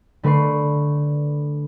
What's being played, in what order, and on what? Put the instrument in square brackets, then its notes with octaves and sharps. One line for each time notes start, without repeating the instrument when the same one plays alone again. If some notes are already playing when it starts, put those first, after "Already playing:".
[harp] D3 A3 B4 D5 C#6 C7